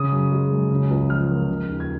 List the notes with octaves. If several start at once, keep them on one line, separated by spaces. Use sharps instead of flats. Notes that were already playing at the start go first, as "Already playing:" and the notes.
Already playing: C#3 D#6
F#2
G#3
F#2
C#3
C#2
F3 F6
A#3
C#3
D#2
G#6